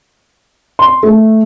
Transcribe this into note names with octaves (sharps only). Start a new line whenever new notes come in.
C6
A3